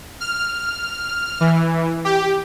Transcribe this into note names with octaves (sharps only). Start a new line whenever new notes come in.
F6
E3
G4